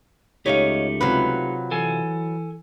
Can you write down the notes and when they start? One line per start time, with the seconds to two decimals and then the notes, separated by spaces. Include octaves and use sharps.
0.46 C#2 A3 D#4 G4 C#5 D#5 F5
1.01 C3 F#3 F4 B4
1.71 E3 A4 G#5